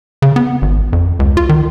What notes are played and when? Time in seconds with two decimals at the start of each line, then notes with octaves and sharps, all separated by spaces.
0.22 C#3
0.36 B3
0.62 G#1
0.93 F2
1.19 C#2
1.37 F4
1.49 D#3